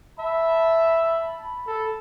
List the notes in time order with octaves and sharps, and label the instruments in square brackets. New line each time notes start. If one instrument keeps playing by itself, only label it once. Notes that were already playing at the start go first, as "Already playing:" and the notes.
[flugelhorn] E5 [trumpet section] A5 B5
[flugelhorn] A4